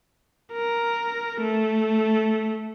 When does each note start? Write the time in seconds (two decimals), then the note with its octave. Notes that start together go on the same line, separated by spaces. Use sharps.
0.53 A#4
1.40 A3